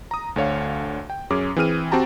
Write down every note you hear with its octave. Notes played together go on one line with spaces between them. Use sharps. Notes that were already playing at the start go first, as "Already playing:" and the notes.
A#5 D#6
D2 D3 C#5 F5
G5
F#2 C#4 G#4 D6
E3 C4 G#4 F6 D#7
C4 F#4 G4 A5 A#5